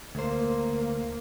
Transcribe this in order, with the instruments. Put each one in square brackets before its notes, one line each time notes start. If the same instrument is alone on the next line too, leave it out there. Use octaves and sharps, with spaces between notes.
[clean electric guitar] D2 C5 [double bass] A#3